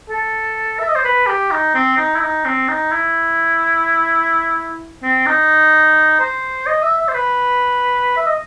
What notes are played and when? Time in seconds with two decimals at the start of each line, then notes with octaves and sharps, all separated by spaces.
0.10 A4
0.80 E5
0.88 D#5
0.96 C5
1.05 B4
1.27 G4
1.51 D#4
1.75 C4
1.97 D#4
2.16 E4
2.21 D#4
2.45 C4
2.68 D#4
2.92 E4
5.03 C4
5.26 D#4
6.20 C5
6.67 D#5
6.83 E5
6.98 E5
7.08 C5
7.14 B4
8.17 E5
8.26 D#5